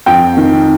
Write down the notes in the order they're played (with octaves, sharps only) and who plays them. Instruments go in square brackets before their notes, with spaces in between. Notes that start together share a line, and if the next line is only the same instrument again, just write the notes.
[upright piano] F2 G5
D#3